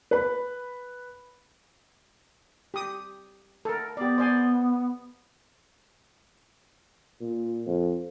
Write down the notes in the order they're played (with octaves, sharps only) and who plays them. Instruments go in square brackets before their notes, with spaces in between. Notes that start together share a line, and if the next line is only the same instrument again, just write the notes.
[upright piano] B4 B5
[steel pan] G4 D#6
A4 A#4
[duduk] B3 [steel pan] G4 D5
[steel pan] C5 D5 G#5
[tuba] A#2
F2